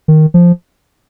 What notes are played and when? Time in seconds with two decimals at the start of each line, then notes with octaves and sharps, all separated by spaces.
0.08 D#3
0.34 F3